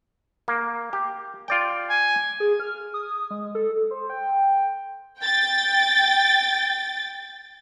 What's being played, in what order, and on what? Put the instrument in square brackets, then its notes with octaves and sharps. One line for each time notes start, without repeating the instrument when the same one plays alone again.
[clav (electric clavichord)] A#3
G4
F4 D5 G5
[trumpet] G#5
[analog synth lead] G#4
F6
D#6
G#3
A4
C5
G5
[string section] G5 A6